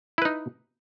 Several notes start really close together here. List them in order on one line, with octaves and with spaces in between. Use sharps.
E4 B4 D#4